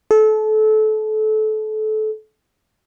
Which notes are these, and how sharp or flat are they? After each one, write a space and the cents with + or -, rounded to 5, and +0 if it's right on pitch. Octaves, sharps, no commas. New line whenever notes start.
A4 -25